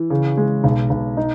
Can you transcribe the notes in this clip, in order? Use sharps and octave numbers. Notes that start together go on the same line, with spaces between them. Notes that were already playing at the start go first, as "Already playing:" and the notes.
Already playing: E3
C#3
G#3
B1
B1
D#4